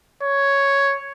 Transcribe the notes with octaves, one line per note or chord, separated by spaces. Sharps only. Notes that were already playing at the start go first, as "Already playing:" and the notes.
C#5